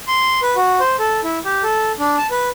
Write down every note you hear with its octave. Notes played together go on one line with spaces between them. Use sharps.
C6
B4
F#4
C5
A4
E4
G4
A4
D4
A5
B4